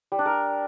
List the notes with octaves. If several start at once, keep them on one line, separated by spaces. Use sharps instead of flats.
G3
D4
A#4